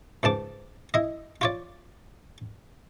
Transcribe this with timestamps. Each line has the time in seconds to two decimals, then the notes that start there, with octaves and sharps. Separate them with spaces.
0.23 C#2 G#2 A5 D6
0.94 E4 D#5
1.41 F4 C#5 D5